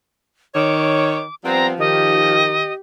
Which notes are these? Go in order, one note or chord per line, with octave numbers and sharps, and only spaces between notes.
D#3 C#5 D6
F3 G3 B3 C4 A#5
D#3 G4 D#5